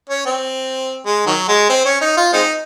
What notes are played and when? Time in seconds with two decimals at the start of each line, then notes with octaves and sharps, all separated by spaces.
0.09 C#4
0.26 C4
1.05 G#3
1.26 D#3 F#3
1.48 G#3
1.69 C4
1.85 C#4
2.01 D#4
2.17 F4
2.33 G#3 C4 D#4